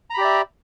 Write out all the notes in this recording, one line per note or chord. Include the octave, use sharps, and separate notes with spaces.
G4 D5 E5 A#5 B5